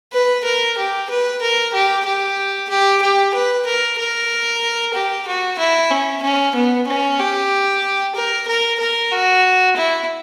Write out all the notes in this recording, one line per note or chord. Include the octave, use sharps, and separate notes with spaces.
B4
A#4
G4
B4
A#4
G4
G4
G4
G4
B4
A#4
A#4
G4
F#4
E4
C#4
C#4
B3
C#4
G4
A#4
A#4
A#4
F#4
E4